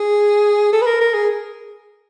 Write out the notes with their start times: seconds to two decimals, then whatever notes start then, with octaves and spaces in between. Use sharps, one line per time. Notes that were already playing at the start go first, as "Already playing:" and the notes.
Already playing: G#4
0.73 A4
0.82 B4
0.87 A#4
1.01 A#4
1.14 G#4